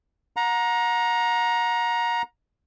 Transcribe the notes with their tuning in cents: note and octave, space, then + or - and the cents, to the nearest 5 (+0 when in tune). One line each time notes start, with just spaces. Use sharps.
F#5 -35 A#5 +15